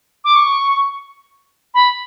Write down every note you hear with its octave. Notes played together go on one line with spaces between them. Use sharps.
D6
C#6
B5